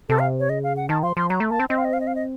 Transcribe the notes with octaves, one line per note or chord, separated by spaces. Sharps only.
C3 A4
F5
C#5
C#3 D#5
F5
F#5
D#3 A5
F3 C6
F3 C6
F#3 A#5
A3
A#3 A5
C4
C4 D#5
F5
D#5
F5
D#5
F5
D#5